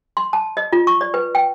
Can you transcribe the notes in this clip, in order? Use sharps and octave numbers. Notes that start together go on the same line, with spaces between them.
C6
A5
D#5
F4
C#6
D5
B4
G5